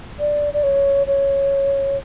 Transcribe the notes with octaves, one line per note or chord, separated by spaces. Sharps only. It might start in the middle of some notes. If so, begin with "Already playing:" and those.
D5
D5
C#5
C#5